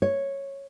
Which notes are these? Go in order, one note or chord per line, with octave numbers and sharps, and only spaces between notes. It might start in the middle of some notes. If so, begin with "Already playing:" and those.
C#5